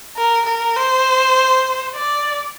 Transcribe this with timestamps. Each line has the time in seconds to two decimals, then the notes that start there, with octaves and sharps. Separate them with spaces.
0.17 A#4
0.46 A#4
0.76 C5
1.95 D5